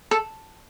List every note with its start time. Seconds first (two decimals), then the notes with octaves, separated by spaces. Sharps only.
0.11 A4